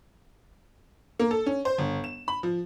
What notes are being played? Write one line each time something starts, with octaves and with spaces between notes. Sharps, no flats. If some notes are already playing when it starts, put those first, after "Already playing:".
A#3
A4
C#4
C5
G1
E7
B5
F3